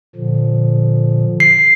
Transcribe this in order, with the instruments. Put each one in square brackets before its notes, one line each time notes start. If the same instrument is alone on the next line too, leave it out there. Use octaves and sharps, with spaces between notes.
[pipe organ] A#2 D3 F3
[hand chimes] C7